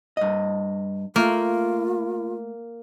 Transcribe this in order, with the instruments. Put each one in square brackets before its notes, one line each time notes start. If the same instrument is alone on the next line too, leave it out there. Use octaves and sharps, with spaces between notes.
[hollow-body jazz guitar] G2 D#5
[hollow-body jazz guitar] A3 [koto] A#3 [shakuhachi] F4